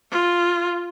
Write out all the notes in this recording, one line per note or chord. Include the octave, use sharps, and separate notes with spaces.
F4